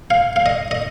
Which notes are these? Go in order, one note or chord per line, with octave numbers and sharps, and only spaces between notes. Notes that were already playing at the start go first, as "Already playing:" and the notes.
F5
F5
D#5
D#5